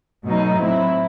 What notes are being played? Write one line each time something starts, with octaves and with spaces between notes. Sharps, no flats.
B2 F#3 A3 D#4
A2 F#3 C4 E4